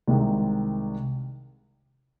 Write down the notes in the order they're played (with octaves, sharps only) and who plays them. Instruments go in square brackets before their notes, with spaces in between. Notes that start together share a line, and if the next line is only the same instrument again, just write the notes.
[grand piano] C2 C3 D#3 G#3